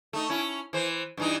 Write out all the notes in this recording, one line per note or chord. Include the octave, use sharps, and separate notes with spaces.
A3 D#4
C#4 E4
E3 C5
G2 E3 D#4